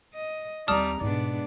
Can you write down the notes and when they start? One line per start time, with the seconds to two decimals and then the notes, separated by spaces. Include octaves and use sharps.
0.14 D#5
0.68 D#2 G3 C4 D5 A5 A#5 D#6 F6
1.01 G#2 B2 G#3 B3 D4 D5